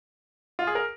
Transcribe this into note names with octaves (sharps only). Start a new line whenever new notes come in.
F4
G#4
A#4